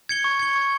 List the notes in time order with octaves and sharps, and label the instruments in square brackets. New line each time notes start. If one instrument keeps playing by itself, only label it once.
[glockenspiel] G#6 C#7 G7
C#6
G#6 C#7 G7
C#6